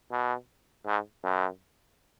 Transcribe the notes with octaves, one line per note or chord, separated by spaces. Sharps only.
B2
G#2
F#2